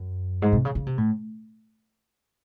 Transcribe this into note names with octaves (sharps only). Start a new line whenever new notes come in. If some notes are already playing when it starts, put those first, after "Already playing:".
Already playing: F#2
G#2
C3
C#3
C#3
C3
A2